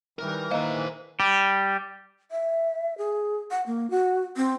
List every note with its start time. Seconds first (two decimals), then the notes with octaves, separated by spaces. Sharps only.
0.19 D#3 E3 G3 A#4
0.51 D#3 A#3 C5 D#5 F5 A#5
1.20 G3
2.32 E5
2.98 G#4
3.51 F#5
3.67 A#3
3.91 F#4
4.37 C4